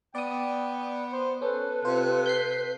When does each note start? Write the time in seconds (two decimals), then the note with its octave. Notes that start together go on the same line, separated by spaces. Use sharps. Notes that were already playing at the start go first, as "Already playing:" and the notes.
0.15 B3 D5 G5 D#6
1.13 C5
1.42 C#4 A4 B4
1.85 C3 F4 C5
2.26 G6 B6 C7